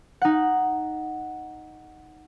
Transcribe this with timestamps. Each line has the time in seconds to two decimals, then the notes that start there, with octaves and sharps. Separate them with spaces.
0.22 D#4 F#5